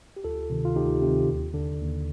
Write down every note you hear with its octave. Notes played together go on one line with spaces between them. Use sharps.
G4
D2 F4 A4
C3 D#3
F4
D2 D#4 G4
C3 D#3
D#2
D3
D#2